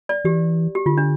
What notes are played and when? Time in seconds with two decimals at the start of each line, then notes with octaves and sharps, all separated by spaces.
0.09 D5
0.24 E3 G4
0.75 G4
0.86 D3 F4
0.98 D4